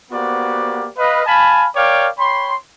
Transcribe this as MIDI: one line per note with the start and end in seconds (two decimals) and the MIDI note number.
0.12 0.89 58
0.12 0.89 59
0.12 0.89 66
0.12 0.89 67
0.12 0.89 72
0.12 0.89 74
0.98 1.24 71
0.98 1.24 75
0.98 1.24 77
1.27 1.67 77
1.27 1.67 80
1.27 1.67 81
1.27 1.67 83
1.76 2.09 70
1.76 2.09 73
1.76 2.09 74
1.76 2.09 77
1.76 2.09 79
1.76 2.09 86
2.18 2.55 73
2.18 2.55 79
2.18 2.55 83
2.18 2.55 84